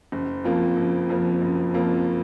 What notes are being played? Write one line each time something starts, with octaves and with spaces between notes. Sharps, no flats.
F#1
F2 F3 A#3
F#1
F2 F3 A#3
F#1
F2 F3 A#3